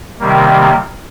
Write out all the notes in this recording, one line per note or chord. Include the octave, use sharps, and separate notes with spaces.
C3 D#3 G3 A#3